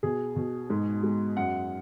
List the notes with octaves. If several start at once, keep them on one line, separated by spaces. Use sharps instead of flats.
B2 G#4
B2
G#2
G#3
F#2 F#5